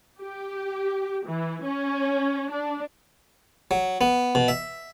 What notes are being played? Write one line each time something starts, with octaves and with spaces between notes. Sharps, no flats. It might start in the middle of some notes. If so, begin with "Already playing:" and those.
G4
E3
C#4
D4
F#3
B3
B2
E5